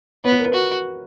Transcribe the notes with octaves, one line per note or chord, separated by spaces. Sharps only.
B3 C#5
B4
A#4
B4
F#4